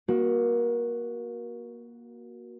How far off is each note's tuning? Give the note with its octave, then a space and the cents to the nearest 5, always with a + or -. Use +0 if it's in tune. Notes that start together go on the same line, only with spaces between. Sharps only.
A#3 +25 F#4 +0